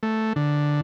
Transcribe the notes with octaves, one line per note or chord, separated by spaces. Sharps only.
A3
D3